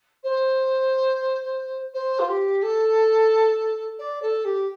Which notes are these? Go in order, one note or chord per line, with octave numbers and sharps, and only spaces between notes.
C5
C5
F4
G4
A4
D5
A4
G4